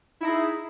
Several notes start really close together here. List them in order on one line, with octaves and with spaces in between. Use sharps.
E4 D#4 G#4